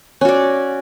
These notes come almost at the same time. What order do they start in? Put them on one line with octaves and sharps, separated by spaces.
C#4 F#4 D5